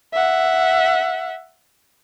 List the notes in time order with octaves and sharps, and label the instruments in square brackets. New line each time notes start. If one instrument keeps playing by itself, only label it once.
[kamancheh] E5 F#5